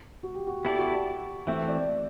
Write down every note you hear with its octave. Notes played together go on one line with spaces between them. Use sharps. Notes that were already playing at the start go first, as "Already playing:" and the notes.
F#4
G4
F#4
B3 E4 G4 A4 D5
F#4
E3 A3 C4 E5
D5